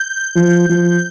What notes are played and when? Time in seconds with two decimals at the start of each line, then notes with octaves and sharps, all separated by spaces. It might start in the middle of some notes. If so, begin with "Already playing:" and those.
Already playing: G6
0.36 F3
0.69 F3